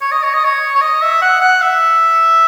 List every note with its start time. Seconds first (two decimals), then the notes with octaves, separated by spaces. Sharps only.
0.01 C#5
0.12 D#5
0.23 C#5
0.33 D#5
0.44 C#5
0.75 C#5
0.81 D#5
1.01 E5
1.22 F#5
1.41 F#5
1.62 E5